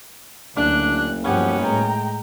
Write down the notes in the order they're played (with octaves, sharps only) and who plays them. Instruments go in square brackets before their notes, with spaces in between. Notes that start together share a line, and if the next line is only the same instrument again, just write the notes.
[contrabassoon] F#1 [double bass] D2 [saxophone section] D4 [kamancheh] F#6
[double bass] G2 F3 [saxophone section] B3 C#4 [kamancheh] G4 F#5
[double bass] A2 G#3 [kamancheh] G5 A#5